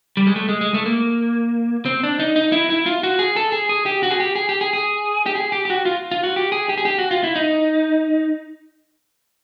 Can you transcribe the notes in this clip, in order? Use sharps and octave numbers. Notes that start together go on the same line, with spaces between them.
G3
G#3
A3
G#3
G#3
A3
A#3
C4
D4
D#4
D#4
E4
E4
F4
F#4
G#4
A4
G#4
G#4
G4
F#4
G#4
G4
G#4
G4
G#4
G#4
G4
G#4
G4
G4
F#4
F4
F4
F#4
G4
G#4
G4
G#4
G4
F#4
F4
E4
D#4